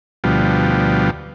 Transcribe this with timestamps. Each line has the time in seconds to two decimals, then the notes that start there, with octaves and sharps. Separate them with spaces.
0.24 D2 B2 F3 G3